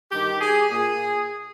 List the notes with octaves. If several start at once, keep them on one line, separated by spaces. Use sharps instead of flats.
G2 D#3 G4
G#4
A#2 G#4